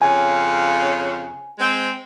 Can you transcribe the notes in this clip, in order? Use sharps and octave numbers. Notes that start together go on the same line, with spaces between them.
F2 C#3 G#5
G#3 C4